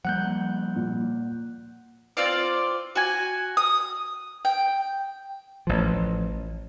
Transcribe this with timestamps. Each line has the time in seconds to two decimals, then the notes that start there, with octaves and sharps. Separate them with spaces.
0.05 F3 G3 A#3 F#5 F#6 G6
0.75 A#2
2.17 C4 F4 D5
2.95 F#4 G#5
3.57 D#6
4.45 G5
5.67 A1 F3